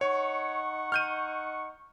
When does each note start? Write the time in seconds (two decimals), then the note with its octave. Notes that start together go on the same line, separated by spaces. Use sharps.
0.01 D#4 C#5 F#5 C#6
0.92 F6 G6 D#7